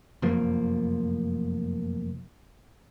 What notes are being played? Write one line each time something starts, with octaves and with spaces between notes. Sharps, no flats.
F1 F#2 F3 A#3